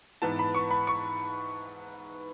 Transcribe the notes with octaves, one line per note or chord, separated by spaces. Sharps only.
G#2 E3 B3 A5
B5
C#6
B5
C#6